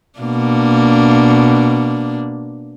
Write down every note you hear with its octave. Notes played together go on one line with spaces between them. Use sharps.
B2 A#3 D4